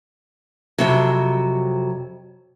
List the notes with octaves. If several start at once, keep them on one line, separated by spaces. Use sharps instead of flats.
F2 C3 F#3